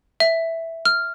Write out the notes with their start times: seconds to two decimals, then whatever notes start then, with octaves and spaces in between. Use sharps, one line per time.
0.20 E5
0.85 F6